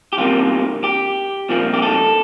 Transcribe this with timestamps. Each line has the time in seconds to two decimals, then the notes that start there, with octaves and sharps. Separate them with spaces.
0.13 G4
0.18 E2 C3 G3 A#3 F4
0.84 G4
1.49 C2 A#2 F3 A#3
1.73 G4
1.82 A4